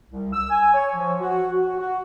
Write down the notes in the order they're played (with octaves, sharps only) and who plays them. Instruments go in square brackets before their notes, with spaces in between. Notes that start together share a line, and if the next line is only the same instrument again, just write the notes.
[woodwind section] C2
E6
G#5
C#5
F3
F#4
F#4
F#4